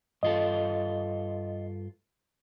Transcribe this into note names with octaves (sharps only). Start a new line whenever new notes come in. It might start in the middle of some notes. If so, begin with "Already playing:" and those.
G2 F4 A4 D#5